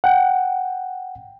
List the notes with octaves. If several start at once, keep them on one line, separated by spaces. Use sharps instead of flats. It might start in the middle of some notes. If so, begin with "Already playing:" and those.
F#5 G5